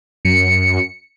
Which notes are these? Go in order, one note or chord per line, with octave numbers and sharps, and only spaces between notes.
F#2 C#7